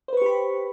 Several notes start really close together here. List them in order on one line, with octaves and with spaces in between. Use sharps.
C5 B4 C#6 G4 B5